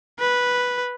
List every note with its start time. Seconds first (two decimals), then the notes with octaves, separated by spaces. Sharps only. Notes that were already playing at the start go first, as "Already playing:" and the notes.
0.19 B4